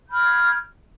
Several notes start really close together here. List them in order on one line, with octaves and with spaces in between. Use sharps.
G6 B5 F6 G#6